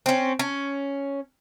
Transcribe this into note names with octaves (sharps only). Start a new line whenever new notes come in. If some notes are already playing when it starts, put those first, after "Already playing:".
C4 C#4
C#4